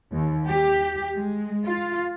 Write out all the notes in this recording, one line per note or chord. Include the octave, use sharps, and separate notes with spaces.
D#2
G4
G#3
F4